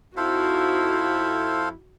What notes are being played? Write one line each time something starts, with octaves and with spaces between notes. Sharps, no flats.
F2 D#4 E4 F#4 A4 C5 F5